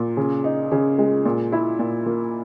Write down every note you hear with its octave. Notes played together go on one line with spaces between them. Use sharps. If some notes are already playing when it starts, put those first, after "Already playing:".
Already playing: A#2
C#3
D#4
C#3
G#3
A#2
E4
A#2
A#3